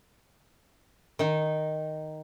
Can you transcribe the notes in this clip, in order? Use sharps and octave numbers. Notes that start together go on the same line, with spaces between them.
D#3 D#4